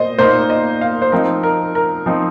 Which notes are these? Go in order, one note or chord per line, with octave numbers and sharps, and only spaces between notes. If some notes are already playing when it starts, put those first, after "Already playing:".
Already playing: A#2 C5 D#5
A#2 A#3 D#4 C5
D#5
F5
C5
F3 C4 D#4 A#4
A#4
A#4
F3 C4 D#4